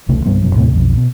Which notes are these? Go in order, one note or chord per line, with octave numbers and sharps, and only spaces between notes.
E1 C2 C#3 A3
C2 G2 G3 B3
F1 F#2 B2
D#2 A2 C3 A3
B1 F2
B2